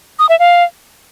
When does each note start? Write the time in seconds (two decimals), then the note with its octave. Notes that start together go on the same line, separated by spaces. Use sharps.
0.19 D#6
0.29 E5
0.39 F5